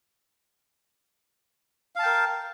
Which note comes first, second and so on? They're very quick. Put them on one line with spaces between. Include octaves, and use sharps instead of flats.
F5 A5 G5 A#4